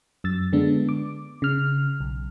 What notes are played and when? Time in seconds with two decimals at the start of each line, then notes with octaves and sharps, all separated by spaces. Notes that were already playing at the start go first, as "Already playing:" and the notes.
0.24 F#2 E6 A6
0.53 D3 G#3 B3 D4
0.89 D6
1.42 C#3 F6
2.00 B1